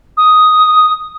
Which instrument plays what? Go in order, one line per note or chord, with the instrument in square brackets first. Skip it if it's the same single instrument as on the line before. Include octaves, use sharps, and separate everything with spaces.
[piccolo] D#6